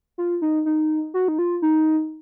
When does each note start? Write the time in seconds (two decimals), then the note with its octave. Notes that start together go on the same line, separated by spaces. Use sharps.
0.18 F4
0.42 D#4
0.66 D#4
1.14 F#4
1.28 D#4
1.39 F4
1.62 D#4